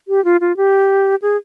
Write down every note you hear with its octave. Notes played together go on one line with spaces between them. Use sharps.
G4
F4
F4
G4
G#4